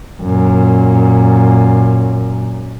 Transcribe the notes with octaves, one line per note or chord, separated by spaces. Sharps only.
F#2 A#2